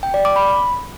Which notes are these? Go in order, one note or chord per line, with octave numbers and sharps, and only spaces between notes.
G5
D5
D6
B5